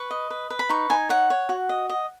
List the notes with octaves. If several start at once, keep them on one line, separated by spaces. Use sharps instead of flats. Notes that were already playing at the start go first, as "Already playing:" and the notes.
Already playing: B4 C#6
D#5
B4
B4
B5
D#4 C#6
D#4 G#5
C#5 F#5
C#5
F#4
D#5
D#5